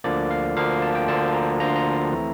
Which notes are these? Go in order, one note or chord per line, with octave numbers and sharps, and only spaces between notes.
D2 D3 F3 A#3 D5
F5
D2 D3 F3 A#3 F5
A5
G5
D2 D3 F3 A#3 A5
A#5
D2 D3 F3 A#3 A#5
C6
A#5
E3 A3 C4 E4